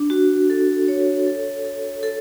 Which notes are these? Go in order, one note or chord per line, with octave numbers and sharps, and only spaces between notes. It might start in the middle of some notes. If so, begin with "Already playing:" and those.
Already playing: D4
F#4
A4
C#5
A4
A4
A4